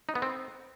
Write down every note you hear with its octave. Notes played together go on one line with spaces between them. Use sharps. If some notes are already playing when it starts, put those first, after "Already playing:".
D#4
B3
C4